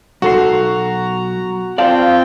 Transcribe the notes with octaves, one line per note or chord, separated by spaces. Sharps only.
B1 F#4 A4 A#5 C6
C4 F4 D5 F5 G5 A5